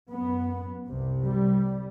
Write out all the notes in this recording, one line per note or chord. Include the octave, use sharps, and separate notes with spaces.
F#2 B3
C2 C3
G3